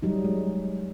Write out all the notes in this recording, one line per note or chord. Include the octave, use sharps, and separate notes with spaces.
F#3 G3 D#4
G#3